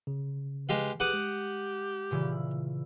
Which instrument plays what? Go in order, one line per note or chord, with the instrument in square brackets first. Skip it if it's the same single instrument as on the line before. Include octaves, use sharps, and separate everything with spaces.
[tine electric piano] C#3
[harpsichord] G#3 G4 F5 [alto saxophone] B4
[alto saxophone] G4 [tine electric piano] G#4 B4 [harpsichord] F#5 D6 D#6
[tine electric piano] G#3
[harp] A#2 C#3 E3